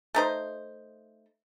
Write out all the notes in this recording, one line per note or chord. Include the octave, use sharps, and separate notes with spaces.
A3 D#4 C5